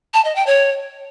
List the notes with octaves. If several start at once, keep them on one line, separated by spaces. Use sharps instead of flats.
A5
D#5
G5
C#5